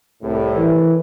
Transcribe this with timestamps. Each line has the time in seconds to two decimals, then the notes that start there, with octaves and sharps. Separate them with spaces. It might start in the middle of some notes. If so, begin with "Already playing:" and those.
0.23 C2 A2
0.55 E3